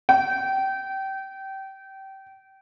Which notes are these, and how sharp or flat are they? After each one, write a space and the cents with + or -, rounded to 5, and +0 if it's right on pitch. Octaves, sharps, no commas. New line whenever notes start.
G5 -25